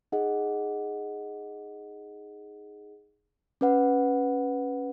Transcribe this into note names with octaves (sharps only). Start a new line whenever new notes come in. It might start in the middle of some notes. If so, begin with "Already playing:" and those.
D#4 G#4 D#5 F#5
C#4 B4 F#5